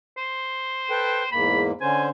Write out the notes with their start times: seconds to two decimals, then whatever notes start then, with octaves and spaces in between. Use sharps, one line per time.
0.18 C5
0.91 A4 B4 G5
1.32 E2 G#2 A#3 B5
1.81 D3 C#4 C5 G#5